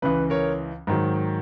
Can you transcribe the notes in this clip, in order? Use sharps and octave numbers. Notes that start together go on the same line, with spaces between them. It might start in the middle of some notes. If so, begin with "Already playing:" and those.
C#2 C#3 E3 B4
A#4 C#5
G#2 D#3 F#3